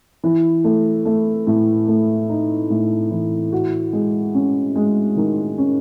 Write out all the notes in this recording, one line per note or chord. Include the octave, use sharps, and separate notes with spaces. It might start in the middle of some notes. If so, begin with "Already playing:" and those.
E3
A3
A3
A2
A3
D#4
A2
E3
F#4
G#3
C#4
G#3
D#3
C#4